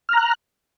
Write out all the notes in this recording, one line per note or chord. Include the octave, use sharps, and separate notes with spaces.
A#5 F6 F#6